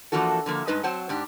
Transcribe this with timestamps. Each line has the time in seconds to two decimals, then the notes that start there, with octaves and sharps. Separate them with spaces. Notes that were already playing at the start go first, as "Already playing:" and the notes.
0.12 E3 F3 A#3 D4 F#4 A4
0.46 D3 F3 A#3
0.67 G2 G#3 D#4 B4 D#5
0.83 F#3 C4 C5 F#5 A5
1.09 G#2 D4 G4